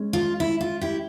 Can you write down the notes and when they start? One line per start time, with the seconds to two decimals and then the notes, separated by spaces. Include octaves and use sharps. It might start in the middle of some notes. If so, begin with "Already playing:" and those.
Already playing: G#3 C#4
0.13 F4
0.40 E4
0.61 F4
0.81 E4 G4